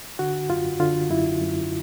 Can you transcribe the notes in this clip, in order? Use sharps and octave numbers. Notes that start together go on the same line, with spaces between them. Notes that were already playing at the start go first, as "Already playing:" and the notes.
D3 F#4
F#2 F4
D3 F4
F#2 E4
F#2